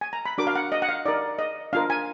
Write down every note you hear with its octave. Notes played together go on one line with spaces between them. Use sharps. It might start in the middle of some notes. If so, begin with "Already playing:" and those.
G#5
A#5
B5
D4 F#4 A#4 D6
F5
F#5
D#5
F#5
F5
D#4 A#4 D5
D#5
D4 F4 A#4 F5
G#5